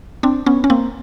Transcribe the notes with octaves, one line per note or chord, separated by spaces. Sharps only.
C4 D4
B3 C#4
C#4
A#3 C4